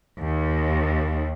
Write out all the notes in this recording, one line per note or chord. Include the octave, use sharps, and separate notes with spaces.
D#2